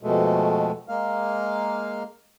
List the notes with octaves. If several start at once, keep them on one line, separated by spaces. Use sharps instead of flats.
F2 B2 G#3 A3
G#3 A#3 F5